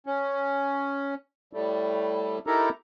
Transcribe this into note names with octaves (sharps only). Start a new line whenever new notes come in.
C#4
A2 G3 A3
D#4 E4 G4 A4 A#4 A#5